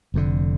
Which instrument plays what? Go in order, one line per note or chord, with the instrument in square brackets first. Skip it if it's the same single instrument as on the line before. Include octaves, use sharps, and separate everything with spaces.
[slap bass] F1 F2 D3